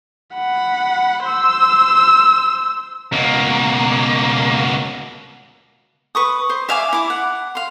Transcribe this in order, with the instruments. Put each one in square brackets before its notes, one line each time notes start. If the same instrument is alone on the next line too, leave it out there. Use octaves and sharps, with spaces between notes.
[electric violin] F#5 B5
C5 E6
[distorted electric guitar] C#2 B2 [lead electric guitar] A#3
[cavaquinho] B4 C#6 D#6
C5
E5 F5 G#5 D6
E4 D6
F#5
F5 C6